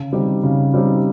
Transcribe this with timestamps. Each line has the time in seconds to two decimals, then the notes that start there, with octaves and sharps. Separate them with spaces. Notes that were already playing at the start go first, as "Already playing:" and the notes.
Already playing: C#3
0.13 G3 C4 D#4 G4
0.43 C#3
0.74 G3 C4 D#4 G4